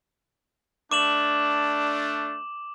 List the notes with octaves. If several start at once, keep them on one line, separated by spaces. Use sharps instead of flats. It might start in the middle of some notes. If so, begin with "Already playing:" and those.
A3 D4 D6 E7 F#7